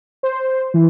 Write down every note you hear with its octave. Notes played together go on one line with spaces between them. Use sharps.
C5
E3